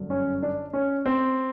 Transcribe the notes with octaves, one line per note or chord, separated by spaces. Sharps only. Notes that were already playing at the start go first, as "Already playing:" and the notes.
Already playing: G1 F#2 D3
C#4
D4
C#4
C4